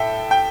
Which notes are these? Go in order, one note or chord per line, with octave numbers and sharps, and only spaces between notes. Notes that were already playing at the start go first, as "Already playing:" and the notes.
Already playing: A2 A4 E5 G5
G5